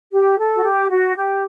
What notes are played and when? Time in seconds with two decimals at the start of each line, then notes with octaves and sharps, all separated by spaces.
0.12 G4
0.38 A4
0.55 F#4
0.64 G4
0.90 F#4
1.16 G4